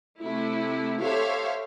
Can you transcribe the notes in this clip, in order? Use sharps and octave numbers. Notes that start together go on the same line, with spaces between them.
C3 A3 E4
G4 A4 C5 C#5 E5 F5